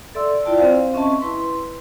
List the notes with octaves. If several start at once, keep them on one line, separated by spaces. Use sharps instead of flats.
A4 D5 E5 C6 E6
E4 F4 D5 G5 A5
C4 C5 F5
C4 C#4 D#5 E5 A5 C#6
E4 B4 C6